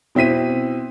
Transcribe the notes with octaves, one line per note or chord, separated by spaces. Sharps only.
B2 C4 E4 B6 D#7